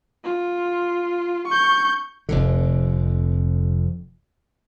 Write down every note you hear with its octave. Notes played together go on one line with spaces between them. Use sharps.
F4
C#6 G6
F1 F2 D3